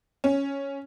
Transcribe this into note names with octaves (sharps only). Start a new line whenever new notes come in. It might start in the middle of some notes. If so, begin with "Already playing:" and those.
C#4